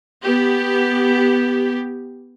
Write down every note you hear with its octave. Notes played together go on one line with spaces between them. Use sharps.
B3 G4